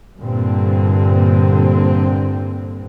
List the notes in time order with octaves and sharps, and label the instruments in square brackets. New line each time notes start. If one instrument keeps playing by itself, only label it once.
[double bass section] G2 A#2 D3 C4